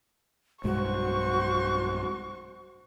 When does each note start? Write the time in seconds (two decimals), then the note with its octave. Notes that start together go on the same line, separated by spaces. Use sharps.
0.64 B1 G2 G#3 F#4 C5 C#6